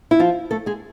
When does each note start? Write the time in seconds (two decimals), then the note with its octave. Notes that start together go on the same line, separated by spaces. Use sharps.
0.11 E4
0.19 F3 F4
0.51 A3 A4
0.66 G#3 G#4